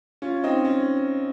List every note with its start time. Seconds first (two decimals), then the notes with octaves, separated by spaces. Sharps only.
0.22 C#4 F4
0.44 C4 D#4
0.65 C#4